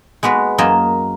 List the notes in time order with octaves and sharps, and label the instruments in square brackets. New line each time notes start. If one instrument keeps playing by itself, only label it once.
[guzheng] G#3 B3 F#4 B4
F#2 A#3 D#5 A5